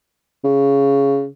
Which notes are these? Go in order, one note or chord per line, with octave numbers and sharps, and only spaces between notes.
C#3